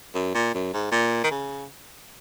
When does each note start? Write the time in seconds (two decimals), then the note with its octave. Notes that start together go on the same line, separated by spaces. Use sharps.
0.15 F#2
0.35 A#2
0.54 F#2
0.74 G#2
0.92 A#2
1.24 D#3
1.31 C#3